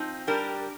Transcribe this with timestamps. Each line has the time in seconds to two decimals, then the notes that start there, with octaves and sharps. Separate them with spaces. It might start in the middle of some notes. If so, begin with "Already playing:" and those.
Already playing: F3 C4 D#4
0.27 G3 D4 G4 A#4